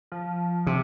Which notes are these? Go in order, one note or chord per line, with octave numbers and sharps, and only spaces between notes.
F3
C3